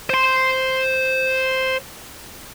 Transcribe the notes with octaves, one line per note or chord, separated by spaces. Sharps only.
C5 C6